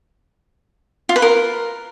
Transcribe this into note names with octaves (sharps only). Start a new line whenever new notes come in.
F4
B4
A#4